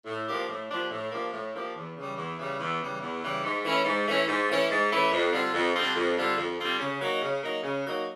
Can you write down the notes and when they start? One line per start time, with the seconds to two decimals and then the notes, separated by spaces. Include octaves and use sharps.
0.06 A2
0.28 F3 A#3 D4 G4
0.49 A2
0.70 F3 A#3 D4 G4
0.91 A2
1.11 F3 A#3 D4 G4
1.33 A2
1.53 F3 A#3 D4 G4
1.75 E2
1.96 C#3 E3 G3
2.17 E2
2.38 C#3 E3 G3
2.59 E2
2.80 C#3 E3 G3
3.01 E2
3.22 C#3 E3 G3
3.44 G#2
3.64 E3 A3 C#4 E4
3.84 G#2
4.06 E3 A3 C#4 E4
4.27 G#2
4.47 E3 A3 C#4 E4
4.69 G#2
4.91 E3 A3 C#4 E4
5.11 F2
5.32 D3 G3 C4 F4
5.54 F2
5.74 D3 G3 C4 F4
5.96 F2
6.16 D3 G3 C4 F4
6.37 F2
6.58 D3 G3 C4 F4
6.79 C#3
7.01 F#3 A#3 D#4
7.22 C#3
7.43 F#3 A#3 D#4
7.63 C#3
7.85 F#3 A#3 D#4